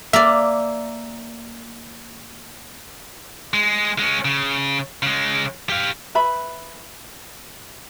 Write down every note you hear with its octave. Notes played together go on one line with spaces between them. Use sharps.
A#3 D5 E5
G#3
G#3 C#4
C#3
C#3 G#3
G4 F5
B4 E5 B5